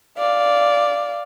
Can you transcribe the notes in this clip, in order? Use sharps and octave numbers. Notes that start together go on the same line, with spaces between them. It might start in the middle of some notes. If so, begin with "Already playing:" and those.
D5 F5